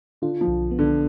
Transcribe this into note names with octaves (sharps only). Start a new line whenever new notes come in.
D3 F4
F3
B1
B3
D3